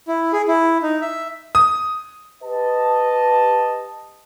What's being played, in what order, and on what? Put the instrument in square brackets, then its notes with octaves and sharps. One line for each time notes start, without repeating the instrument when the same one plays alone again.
[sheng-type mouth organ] E4
G#4
E4
D#4
E5
[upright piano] D#6
[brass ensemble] G4 B4 D#5 A5